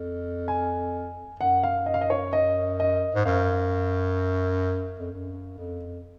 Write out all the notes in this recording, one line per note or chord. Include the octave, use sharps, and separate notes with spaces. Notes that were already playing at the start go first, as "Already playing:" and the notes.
Already playing: F2
G#5
F#2 F#5
F5
D#5
F5
D#5
C#5
D#5
D#5
G#2
F#2 F5
F2
F#2
F2